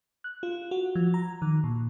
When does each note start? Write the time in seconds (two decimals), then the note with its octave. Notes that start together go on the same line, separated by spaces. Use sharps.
0.24 F#6
0.43 F4
0.71 F#4
0.95 F3
1.14 A#5
1.42 D#3
1.64 A#2